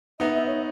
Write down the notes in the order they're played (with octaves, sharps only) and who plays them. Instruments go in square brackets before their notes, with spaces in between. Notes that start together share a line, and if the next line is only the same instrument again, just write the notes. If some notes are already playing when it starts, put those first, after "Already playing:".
[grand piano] B3 D#4 [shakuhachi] E5
[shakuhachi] E5
C#5